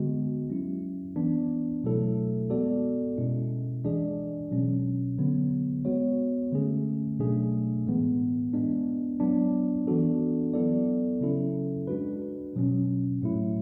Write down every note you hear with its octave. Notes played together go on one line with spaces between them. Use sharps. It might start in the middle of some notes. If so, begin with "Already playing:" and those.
Already playing: D3 G#3 B3 F#4
F#3 C#4 E4
E3 B3 D4
B2 F#3 A3 E4 A4
G#3 B3 F#4 A4 D5
B2 G#3 C#4 E4
E3 G#3 D4 G#4 D5
B2 F#3 C#4
D3 F#3 B3
G#3 B3 F#4 C#5
D3 A3 C#4 G#4
B2 F#3 A3 D4 G#4
A2 E3 G#3 B3
G#3 B3 D4
F#3 B3 D4
E3 B3 D4 F#4 A4
F#3 B3 E4 A4 D5
C#3 F#3 C#4 E4 A4
G#3 D4 F#4 B4
B2 F#3 C#4
A2 F#3 A3 E4